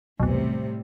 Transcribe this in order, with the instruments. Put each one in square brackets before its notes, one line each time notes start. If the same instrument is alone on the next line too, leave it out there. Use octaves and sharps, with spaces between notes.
[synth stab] B1 E2 [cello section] A2 C3 G3